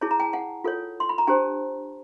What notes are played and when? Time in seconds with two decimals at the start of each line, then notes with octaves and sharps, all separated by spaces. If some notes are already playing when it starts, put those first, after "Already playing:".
0.01 E4 G#4 C#5 A5
0.11 A#5
0.20 G5 A5
0.33 F#5 G#5
0.64 F4 A4 C#5
1.00 C6
1.09 B5
1.18 A#5
1.27 D4 G4 C5 G5 A5